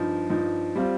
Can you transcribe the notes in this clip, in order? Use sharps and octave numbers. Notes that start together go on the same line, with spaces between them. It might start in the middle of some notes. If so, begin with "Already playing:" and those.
Already playing: G2 F3 D#4
G2 F3 D#4
G3 C4 F4